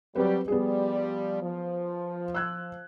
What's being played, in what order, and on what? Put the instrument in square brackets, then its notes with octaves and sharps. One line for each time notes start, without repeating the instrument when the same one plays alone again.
[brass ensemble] F#3 G3 G4 [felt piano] C4 B4
[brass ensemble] F3 G3 [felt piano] B3 G#4
[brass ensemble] F3
[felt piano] E6 F#6 G#6